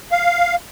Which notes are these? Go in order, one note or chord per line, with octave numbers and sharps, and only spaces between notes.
F5